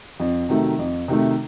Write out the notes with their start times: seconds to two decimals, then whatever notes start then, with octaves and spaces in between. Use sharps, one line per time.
0.20 F2
0.49 C3 D#3 F#3 A3
0.78 F2
1.08 C3 D#3 F#3 A3